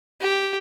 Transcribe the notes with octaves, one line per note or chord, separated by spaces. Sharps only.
G4